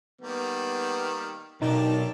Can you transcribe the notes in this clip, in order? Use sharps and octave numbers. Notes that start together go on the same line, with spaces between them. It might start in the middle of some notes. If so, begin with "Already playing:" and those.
D#3 G3 A#3 B3
B1 D4 D#4 G4 A#4 A5